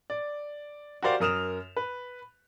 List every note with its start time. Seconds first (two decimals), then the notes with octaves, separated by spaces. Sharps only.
0.10 D5
1.03 F#4 G4 A#4 C5 D5 F5
1.20 F#2 A#4 D#6 F6 E7 F7
1.77 B4